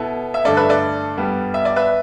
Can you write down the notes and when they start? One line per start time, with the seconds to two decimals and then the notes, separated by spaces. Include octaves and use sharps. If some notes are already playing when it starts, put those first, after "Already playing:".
Already playing: B2 B3 E4 A4
0.34 E5
0.45 G2 D3 A3 A4 D5
0.57 B4 E5
0.69 A4 D5
1.17 G2 G3 B3
1.54 E5
1.65 D5
1.76 B4 E5